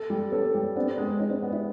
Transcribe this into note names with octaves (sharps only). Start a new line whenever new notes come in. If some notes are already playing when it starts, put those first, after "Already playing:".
Already playing: A4
G3
B3 C#4 A4
G3
B3 C4 D4
G#3
G#3 C#4 D#4
C4 D4
B3
D4 E4